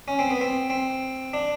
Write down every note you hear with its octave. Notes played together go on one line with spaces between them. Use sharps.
C#4
C4
B3
C4
C4
D4